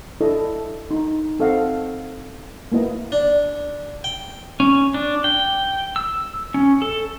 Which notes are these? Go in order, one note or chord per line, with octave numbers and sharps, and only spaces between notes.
D4 E4 A4 D#5
D#4
C4 A4 D#5 F5 F#5
A#3 B3 E4 D#5
D4
G5
C#4
D4
G5
E6
C#4
A4